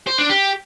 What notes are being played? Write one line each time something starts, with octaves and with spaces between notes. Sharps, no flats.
C5
D4
G4